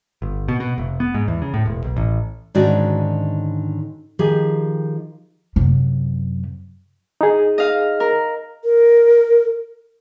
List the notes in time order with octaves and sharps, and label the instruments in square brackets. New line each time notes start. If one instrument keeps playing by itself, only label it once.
[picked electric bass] G1
B2
B2
F1
B3
G#2
E2
C#3
A2
E1
B1
A1
[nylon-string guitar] G#2 D3 D#3 C#4 F#4 D5
D#3 F3 G4 G#4
[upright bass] F#2 C3
[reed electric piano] D#4 G#4
[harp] D#5 F5
A#4
[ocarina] A#4